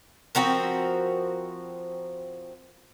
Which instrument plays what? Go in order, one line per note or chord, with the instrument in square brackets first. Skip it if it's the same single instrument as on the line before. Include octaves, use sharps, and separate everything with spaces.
[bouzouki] F3 C4 F#4 A#4